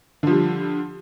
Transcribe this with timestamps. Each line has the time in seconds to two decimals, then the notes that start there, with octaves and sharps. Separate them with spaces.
0.23 D3
0.27 F3
0.31 G3